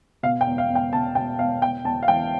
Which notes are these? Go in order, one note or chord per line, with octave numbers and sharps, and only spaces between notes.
B2 F5
G5
E2
F5
E2
G5
B2 A5
B2 G5
E2 F5
E2 G5
E2 A5
F5
E3 G5